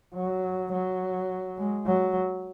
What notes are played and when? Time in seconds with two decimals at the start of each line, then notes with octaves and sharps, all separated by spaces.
0.15 F#3
0.72 F#3
1.58 G#3
1.87 F#3